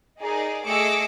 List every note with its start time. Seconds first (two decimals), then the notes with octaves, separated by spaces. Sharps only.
0.21 D#4 G#4 A#4 D5
0.66 A3 G#4 D#5 D6 E6 C#7